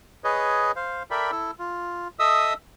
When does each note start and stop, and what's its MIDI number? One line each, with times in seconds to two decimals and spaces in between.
0.24 0.72 68
0.24 0.72 71
0.24 0.72 73
0.24 0.72 75
0.76 1.03 72
0.76 1.03 77
1.11 1.31 69
1.11 1.31 70
1.11 1.31 74
1.11 1.31 76
1.11 1.31 79
1.11 1.31 83
1.32 1.51 64
1.32 1.51 69
1.59 2.08 65
2.19 2.54 69
2.19 2.54 75
2.19 2.54 76
2.19 2.54 87
2.19 2.54 88